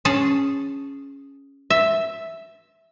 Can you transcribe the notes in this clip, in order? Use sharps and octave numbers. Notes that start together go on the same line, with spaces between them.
C#4 G#4 A5
E5